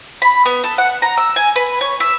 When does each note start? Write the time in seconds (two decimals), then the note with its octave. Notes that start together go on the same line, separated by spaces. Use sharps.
0.22 B5
0.46 B3
0.64 A4
0.78 F#5
1.02 A#5
1.18 E6
1.36 G#5
1.56 B4
1.81 C#5
2.00 E5